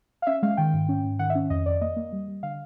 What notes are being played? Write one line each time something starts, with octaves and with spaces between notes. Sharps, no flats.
F5
C#4 E5
G#3 F5
D#3 G5
G#2
C#4
G#2
D#3 F#5
E5
C#4
F2 D#5
F2 D5
A#3 D#5
A#3
G3
G3
D3 F5